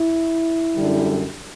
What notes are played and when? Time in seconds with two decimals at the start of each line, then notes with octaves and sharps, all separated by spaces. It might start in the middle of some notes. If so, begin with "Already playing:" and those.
Already playing: E4
0.75 F#2 D3 G3